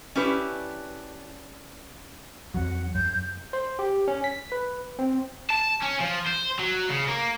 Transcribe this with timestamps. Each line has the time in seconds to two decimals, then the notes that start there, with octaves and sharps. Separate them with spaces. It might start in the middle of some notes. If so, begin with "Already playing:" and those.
0.15 C#4 D4 E4 G4 B4
2.54 F2 F#3 F#5
2.95 F#2 G6
3.53 C5
3.79 G4
4.08 C#4
4.24 B6
4.52 B4
4.99 C4
5.50 A5
5.82 C#4
6.00 F3
6.26 C5
6.59 F#3
6.89 C#3
7.08 A#3